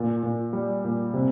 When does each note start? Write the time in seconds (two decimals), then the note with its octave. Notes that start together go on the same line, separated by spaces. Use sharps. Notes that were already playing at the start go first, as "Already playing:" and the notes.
Already playing: A#2
0.23 A#2
0.53 G3
0.84 A#2
1.14 C3